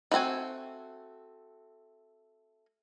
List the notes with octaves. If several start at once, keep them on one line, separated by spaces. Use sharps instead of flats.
E3 A3 C4 F#4 G#5